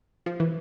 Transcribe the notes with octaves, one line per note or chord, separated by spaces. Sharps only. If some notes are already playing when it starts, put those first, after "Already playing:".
F3
E3